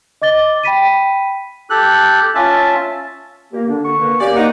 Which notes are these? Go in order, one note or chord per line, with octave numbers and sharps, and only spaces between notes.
D#5 D6 A6 G7
G5 B5 B6 D#7
G4 A4 F#6
C#4 F4 E5 A5
A#3 G4
D3 D4
C#6
A#3 B4
A#3 C#4 G4 D5
C4 D#4 F#5